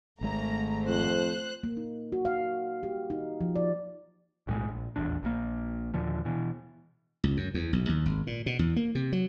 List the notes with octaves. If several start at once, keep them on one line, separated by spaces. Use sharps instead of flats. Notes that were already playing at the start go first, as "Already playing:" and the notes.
G#1 G#3 A3 A#5
F2 C5 F#6
A#3
D#4
F#4
F5
G4
D#4
F3
D5
B1 A2 F#3 G#3
A#1
D#1 A1 E2 D4
A#1 F3 A#3
D#2 A#2 D3 F3
B2 E3
C#2
F#2
E2
B1
D#2
G#1
A#2
B2
E2
A#3
C3
F#3